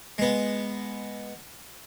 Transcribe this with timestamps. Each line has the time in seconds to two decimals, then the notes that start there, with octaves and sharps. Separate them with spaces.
0.18 G#3 B3